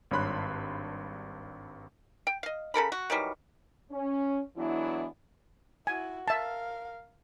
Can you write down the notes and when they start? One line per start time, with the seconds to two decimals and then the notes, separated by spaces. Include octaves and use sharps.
0.11 G#1 G2 C#5 B5 C6 F#6
2.27 G5
2.43 D#5 F5
2.74 C#3 A4 A#4 B5
2.92 F#4
3.10 D#3 E3 F#3 G3
3.91 C#4
4.57 E3 F#3 G#3 B3 D4 E4
5.87 E4 F#4 G#5
6.28 A#4 E5 F5 A5